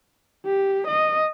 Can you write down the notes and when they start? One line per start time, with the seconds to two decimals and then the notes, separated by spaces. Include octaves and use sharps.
0.45 G4
0.87 D#5